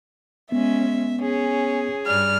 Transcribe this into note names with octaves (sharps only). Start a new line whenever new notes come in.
G#3 B3 C#4 E5
C#4 G#4
G2 G3 F6